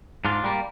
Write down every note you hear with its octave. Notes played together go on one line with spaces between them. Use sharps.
G#2 D4 F4
G3 A#3